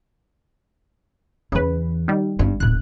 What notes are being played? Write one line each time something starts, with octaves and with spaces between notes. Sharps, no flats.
E2 C#3 E3 B4
D#3 G3
G#1 G2
D#1 A2 F#6